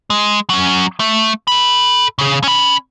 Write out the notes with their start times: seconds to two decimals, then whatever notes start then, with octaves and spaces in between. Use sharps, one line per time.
0.10 G#3
0.50 F#3 C#4
1.00 A3
1.48 A4 B5
2.19 C#3 G#4
2.44 C#4 B5